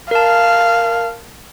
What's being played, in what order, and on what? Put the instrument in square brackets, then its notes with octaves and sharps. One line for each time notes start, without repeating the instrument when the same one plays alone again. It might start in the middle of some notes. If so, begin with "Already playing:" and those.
[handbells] A#4 A5 [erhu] F5